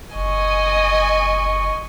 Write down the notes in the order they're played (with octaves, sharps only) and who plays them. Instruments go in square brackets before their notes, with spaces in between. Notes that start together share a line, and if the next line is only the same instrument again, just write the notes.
[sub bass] F#1 [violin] D#5 G#5 [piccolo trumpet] C#6